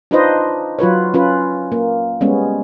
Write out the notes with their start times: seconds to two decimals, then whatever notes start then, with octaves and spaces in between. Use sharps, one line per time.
0.11 D4 D#4 F4 B4 C5 D#5
0.79 F#3 F4 B4 C#5
1.14 C#4 F4 B4
1.72 A#3
2.21 G3 G#3 B3 C#4